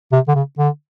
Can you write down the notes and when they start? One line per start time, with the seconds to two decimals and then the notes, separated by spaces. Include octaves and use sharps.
0.12 C3
0.28 D3
0.35 C#3
0.58 D3